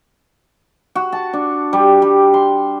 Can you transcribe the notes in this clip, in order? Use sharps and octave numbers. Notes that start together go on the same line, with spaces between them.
F#4
A5
D4
G3
G3
C6